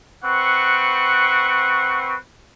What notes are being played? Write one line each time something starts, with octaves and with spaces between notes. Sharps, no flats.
C4 B4 F#5 C#6